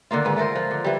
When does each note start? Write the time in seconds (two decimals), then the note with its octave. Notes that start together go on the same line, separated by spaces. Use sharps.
0.11 D3 D#3 A#3 F4
0.25 G#2 B4
0.36 A3 A4 A#4 C5
0.56 F3
0.71 D3
0.84 E3 G3